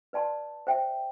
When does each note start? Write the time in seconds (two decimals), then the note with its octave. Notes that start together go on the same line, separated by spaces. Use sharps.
0.13 B4 D5 A5 C6
0.67 C5 E5 G5